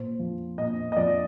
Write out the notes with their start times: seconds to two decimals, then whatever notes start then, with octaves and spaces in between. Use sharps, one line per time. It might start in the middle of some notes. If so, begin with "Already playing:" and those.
Already playing: A#2 C5
0.19 F3
0.58 A#2 D#5
0.92 D#5
0.97 F3 D5